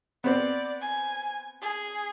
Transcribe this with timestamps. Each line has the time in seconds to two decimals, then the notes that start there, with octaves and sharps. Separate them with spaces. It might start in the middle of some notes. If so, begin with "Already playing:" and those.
0.24 B3 C4 C5 D5
0.81 G#5
1.62 G#4